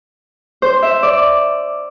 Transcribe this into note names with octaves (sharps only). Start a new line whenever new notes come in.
C5
E5
D5